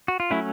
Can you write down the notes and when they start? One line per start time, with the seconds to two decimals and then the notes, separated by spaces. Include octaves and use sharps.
0.08 F#4
0.20 F4
0.31 F#3 A3 C#4 E4